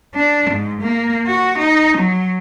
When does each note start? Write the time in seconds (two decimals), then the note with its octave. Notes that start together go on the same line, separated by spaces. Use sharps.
0.14 D4
0.50 G#2
0.82 A#3
1.27 F#4
1.59 D#4
1.97 F#3